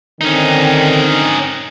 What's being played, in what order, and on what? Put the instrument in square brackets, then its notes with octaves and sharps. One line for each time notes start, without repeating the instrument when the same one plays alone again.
[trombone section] D3 D#3 C4 [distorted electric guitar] C#4 D#4